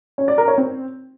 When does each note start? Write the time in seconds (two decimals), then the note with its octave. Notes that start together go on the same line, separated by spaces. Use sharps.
0.18 C#4
0.28 D5
0.38 A#4
0.48 C#5
0.58 C4